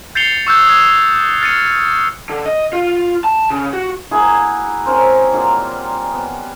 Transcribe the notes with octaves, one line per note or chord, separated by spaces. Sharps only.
G6 A6 C7 C#7 F7 G7
C#6 E6 F#6 G6
D#6 E6 G#6
F6 A6 C#7 D#7
D3
D#5
F4
A5
C#3
F#4
A#3 E4 F#4 G#4
C4 C#4 A#4 C5
A#2 D#3 F#3 G3
B3